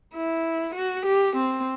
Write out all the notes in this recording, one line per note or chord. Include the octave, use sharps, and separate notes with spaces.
E4
F#4
G4
C4